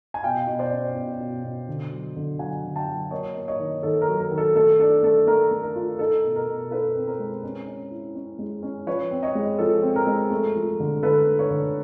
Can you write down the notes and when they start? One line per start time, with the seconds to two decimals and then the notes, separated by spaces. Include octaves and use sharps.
0.14 G#5
0.23 B2 F5 G5
0.47 B2
0.59 C5 D5
0.72 C#4
0.95 B2
1.20 B2
1.43 B2
1.68 D3
1.92 F#3
2.16 D3
2.39 F#3 F#5 G#5
2.64 D3
2.76 G5 A5
2.88 F#3
3.11 A#3 C#5 D#5
3.36 A#3
3.48 C#5 D#5
3.59 D#3
3.83 D#3 A4
4.02 A#4
4.08 F#3
4.20 A#4
4.32 D#3
4.38 A4
4.55 A3 A4
4.79 D4 A4
5.03 A3 A4
5.27 A3 A#4
5.51 A3
5.63 A#4
5.76 F4
5.99 D#4 A4
6.24 B2
6.36 A#4
6.47 B2
6.71 D#4 A4 B4
6.96 C4
7.07 A#4 C5
7.20 G#3
7.43 C#4
7.67 C#4
7.91 E4
8.15 C#4
8.39 G#3
8.63 C#4
8.87 F3 B4 C#5
9.11 C4
9.23 C#5 D#5
9.35 G#3
9.59 F3 A4
9.83 C4
9.96 A#4
10.07 G#3
10.31 A3
10.55 F3
10.80 D3
11.03 D3 A4 B4
11.27 A3
11.39 B4 C#5
11.51 D3